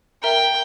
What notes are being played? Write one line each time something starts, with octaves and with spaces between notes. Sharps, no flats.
A#4 E5 G5 A#5